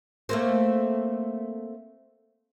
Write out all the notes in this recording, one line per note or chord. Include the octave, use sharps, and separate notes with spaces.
A3 A#3 C4